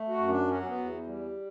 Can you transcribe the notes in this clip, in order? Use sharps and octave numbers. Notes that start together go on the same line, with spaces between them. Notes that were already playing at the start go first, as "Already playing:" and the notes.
Already playing: A3
F#4
F#2
D4
F#3 C#4
C#4
B3
E2
G3